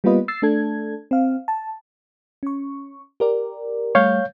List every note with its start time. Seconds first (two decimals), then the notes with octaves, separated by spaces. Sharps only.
0.04 G3 A#3 B3 F4 B4 D#5
0.28 E6 A6 C7
0.42 A3 D4 A4 G#6
1.11 C4 F5
1.48 A5
2.43 C#4 C#6
3.20 G4 A#4 D5
3.95 G3 A3 C#5 F5 G6